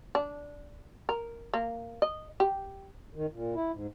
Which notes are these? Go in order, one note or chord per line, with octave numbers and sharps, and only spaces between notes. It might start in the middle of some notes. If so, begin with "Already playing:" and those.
D4
A#4
A#3
D#5
G4
D#3
A#2
E4
G#2